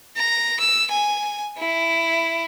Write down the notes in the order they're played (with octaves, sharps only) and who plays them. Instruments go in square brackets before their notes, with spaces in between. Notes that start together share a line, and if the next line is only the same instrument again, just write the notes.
[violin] A#5
E6
G#5
E4